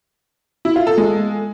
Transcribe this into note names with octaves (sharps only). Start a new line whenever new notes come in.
E4
F4
A4
G#3